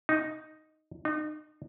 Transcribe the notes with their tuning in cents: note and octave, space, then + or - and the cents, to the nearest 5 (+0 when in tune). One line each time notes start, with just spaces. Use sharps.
D#4 +0
D#4 -35